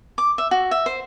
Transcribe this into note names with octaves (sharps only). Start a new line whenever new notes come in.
D6
E5
F#4
E5
C5